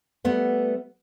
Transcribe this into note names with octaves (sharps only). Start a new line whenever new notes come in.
G3 A3 B3